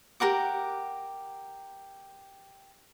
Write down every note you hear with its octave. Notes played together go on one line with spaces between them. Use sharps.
G4 A#4 F#5 D6